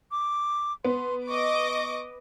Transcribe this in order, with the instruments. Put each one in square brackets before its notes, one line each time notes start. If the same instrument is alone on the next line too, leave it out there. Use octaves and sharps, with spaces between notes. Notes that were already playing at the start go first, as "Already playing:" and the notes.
[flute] D6
[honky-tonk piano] B3 [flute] C6
[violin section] D#5 D6 [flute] C#6